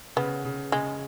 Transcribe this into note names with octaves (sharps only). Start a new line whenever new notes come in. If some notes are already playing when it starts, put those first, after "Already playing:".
C#3 B3
C#3
C#3 G#3